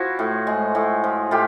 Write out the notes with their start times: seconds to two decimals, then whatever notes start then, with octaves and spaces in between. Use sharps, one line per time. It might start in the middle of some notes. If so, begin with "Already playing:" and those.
Already playing: F3 E4 F#4
0.19 A2
0.47 G#3
0.75 A2
1.04 F3
1.31 A2 F4 G4